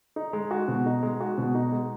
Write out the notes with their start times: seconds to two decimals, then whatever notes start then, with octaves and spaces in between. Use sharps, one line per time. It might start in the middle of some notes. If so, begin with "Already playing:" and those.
0.16 D#4
0.33 G#3
0.51 F#4
0.68 B2
0.86 D#4
1.03 G#3
1.20 F#4
1.38 B2
1.55 D#4
1.72 G#3